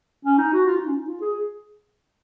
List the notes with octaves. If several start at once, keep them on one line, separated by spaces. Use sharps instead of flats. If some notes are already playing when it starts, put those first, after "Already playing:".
C#4
D#4
F#4
F4
D#4
C#4
D#4
F4
G#4